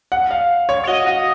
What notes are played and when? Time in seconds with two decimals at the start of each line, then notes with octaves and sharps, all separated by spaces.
0.12 F#5
0.31 F5
0.69 C#5
0.83 C#5
0.87 F#4 D#5
1.06 F#4